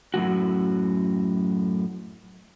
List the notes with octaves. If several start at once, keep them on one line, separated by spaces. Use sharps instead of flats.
F#2 A2 C#3 F#4